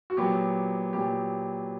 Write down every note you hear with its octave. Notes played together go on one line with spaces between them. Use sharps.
F#4
A#2 F#3 B3 G4
A#2 F#3 B3 G4